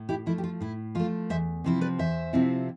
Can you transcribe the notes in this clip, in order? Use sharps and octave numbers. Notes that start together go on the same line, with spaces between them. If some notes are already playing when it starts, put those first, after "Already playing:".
Already playing: A2
E4 G4
F3 A3 E4
G4
F4
A2 E4
F3 A3 F4
E2 C5 E5
C3 F3 C4 E4
B4 D5
E2 C5 E5
C3 F3 C4 E4